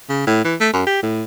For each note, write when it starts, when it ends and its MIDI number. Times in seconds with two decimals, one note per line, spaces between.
0.09 0.22 49
0.27 0.44 45
0.45 0.55 52
0.60 0.70 57
0.73 0.83 42
0.87 1.02 67
1.03 1.25 45